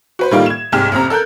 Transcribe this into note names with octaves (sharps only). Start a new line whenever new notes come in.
F#4 B4 C5
A2 D#3 G3 A#3 D#4 F4
G#6 E7
C2 G#2 G4 G#4 F6 E7
A1 F2 C3 A#5
A4 A#4 F#6 G6